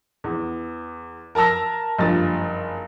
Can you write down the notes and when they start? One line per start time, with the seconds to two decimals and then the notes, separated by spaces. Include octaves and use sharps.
0.24 E2
1.35 A#4 A5 A#5 E6 A#6
1.98 F#1 G2 F3 A6